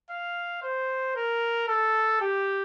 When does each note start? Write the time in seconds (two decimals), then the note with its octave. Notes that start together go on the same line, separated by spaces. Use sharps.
0.10 F5
0.62 C5
1.16 A#4
1.68 A4
2.21 G4